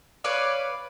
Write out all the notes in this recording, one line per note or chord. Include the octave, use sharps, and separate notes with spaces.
B4 C#5 D5 F5